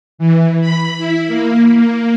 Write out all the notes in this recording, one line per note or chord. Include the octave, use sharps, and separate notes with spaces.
E3
B5
E4
A#3
A#3